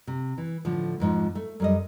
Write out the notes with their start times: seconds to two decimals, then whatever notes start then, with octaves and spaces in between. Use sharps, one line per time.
0.07 C3
0.38 E3
0.65 A2 D3 F3
1.00 F2 G#2 F3
1.35 A3
1.60 F#2 G3 D#5